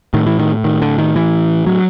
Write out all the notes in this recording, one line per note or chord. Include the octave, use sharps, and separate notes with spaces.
A2 D#3
E3
D#3
D#3
D3
D#3
E3
F#3